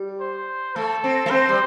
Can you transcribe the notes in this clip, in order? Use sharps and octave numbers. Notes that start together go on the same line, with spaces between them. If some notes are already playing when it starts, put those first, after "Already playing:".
Already playing: G3
C5
A3 A4
C4
A3
C4 C5
G3